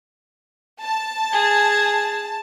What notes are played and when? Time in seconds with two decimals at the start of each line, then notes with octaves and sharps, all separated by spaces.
0.80 A5
1.32 G#4 G#5